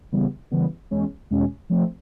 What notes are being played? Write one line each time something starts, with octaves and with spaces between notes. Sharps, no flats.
C#3 E3 G3 B3
C#3 E3 G3 B3
E2 B2 G#3 C#4
E2 B2 G#3 C#4
F3 A3 C4